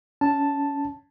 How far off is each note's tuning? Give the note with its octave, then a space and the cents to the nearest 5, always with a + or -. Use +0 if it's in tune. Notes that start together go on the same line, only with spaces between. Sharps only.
C#4 +20 A5 +0